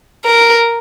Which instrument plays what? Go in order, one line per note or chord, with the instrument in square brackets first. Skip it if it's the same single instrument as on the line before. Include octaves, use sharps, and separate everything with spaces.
[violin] A#4